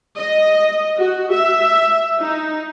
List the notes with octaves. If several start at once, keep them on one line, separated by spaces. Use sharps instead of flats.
D#5
F#4
E5
D#4